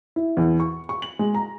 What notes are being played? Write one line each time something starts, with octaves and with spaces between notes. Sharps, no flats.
E4
E2
C#6
C#6
F#7
G#3
A#5